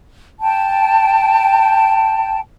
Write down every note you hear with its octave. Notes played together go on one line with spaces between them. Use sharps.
G5 A5